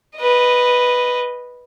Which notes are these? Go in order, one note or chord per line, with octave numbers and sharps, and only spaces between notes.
B4 D#5